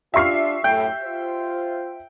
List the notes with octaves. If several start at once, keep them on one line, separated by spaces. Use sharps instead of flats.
D4 F4 G4 E5 C#6 F6 C7
F#2 A2 G5
F4 C5